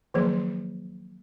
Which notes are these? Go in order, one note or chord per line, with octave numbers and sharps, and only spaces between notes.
D#3 F3 F#3 A#3 G#4